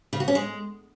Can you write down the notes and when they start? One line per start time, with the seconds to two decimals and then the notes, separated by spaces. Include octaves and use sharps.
0.13 C#3
0.20 F#4
0.28 C#4
0.35 G#3